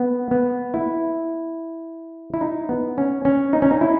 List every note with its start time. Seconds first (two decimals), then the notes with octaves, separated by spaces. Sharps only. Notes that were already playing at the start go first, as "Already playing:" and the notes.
Already playing: B3
0.31 B3
0.74 E4
2.34 E4
2.41 D#4
2.69 B3
2.98 C#4
3.25 C#4
3.53 D#4
3.62 C#4
3.71 D#4
3.81 E4